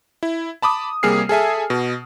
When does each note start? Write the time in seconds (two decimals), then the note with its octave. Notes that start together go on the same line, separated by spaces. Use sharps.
0.23 E4
0.62 A5 B5 D6 D#6
1.03 C3 G3 A#3 G#4 F6 C7
1.29 G#4 A4 E5 G#5
1.70 B2